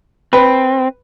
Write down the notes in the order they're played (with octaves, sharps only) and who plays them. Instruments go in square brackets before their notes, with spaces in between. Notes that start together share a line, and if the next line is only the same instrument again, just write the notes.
[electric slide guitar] C4 [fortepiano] B4